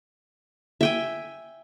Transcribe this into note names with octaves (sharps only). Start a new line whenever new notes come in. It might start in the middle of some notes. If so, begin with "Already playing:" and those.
E5 G5 G#5